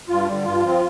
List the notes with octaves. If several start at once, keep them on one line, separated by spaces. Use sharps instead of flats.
G2 F4
D3 G3
G2 F4
F3 C4